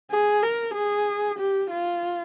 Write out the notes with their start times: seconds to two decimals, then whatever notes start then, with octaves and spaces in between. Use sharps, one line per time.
0.11 G#4
0.43 A#4
0.74 G#4
1.39 G4
1.70 F4